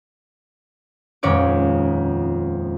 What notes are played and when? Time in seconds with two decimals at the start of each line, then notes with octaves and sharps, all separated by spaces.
1.23 D#1 F2 G#3 C#4 C#5 D6